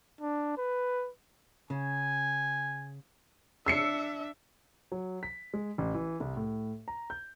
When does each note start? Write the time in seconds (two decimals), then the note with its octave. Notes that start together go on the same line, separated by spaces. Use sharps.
0.21 D4
0.57 B4
1.70 C#3 G#5
3.66 D4 E5 E6 C7 C#7
4.92 F#3
5.23 B6
5.54 G#3
5.78 A1
5.94 E3
6.20 C2
6.37 A2
6.88 A#5
7.10 G6